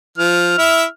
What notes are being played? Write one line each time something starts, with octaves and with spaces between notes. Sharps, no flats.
F3 F6
E4 E5